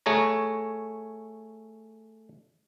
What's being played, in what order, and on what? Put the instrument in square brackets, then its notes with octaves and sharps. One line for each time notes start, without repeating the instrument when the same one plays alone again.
[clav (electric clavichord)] A3 G#4 C#5 A#5